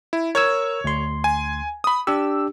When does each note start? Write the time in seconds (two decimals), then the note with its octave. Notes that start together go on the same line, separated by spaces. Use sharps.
0.13 E4
0.35 A#4 C#5 E6 G#6
0.84 D2 C6
1.24 G#5
1.84 B5 D#6
2.07 D4 G4 E6